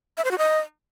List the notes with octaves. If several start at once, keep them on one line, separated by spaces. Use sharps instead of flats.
E5
C5
F#4
D#5